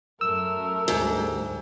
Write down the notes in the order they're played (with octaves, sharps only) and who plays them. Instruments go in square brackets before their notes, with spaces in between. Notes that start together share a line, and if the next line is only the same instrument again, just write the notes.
[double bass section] F#2 [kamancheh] A3 A#4 [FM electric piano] E6
[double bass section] D2 G3 [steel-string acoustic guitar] G#2